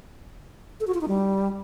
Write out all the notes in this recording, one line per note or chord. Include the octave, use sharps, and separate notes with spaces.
A4
F#4
F4
D#4
G3